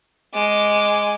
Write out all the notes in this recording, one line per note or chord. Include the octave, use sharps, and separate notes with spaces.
G#3 D6